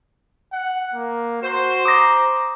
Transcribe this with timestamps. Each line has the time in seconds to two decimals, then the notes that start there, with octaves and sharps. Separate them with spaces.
0.52 F#5
0.94 A#3
1.43 F#4 C5
1.85 A#5 D6 D#6 A#6